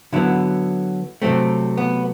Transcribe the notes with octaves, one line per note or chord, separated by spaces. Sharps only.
D3 F#3 B3 E4
C3 F#3 A3 C4
B3